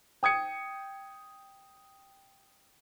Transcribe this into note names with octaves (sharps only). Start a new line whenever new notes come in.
G5 D#6 G#6 C#7